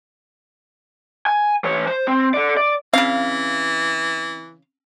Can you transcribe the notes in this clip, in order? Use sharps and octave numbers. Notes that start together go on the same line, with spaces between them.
G#5
E3 C#5
C5
C4
A4 D5
D5
C#3 E3 C4 C#4 F5